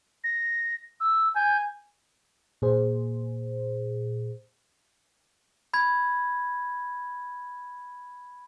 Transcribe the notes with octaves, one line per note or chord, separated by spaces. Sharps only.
A#6
E6
G#5 G6
A#2 G#4 C5
B5 G#6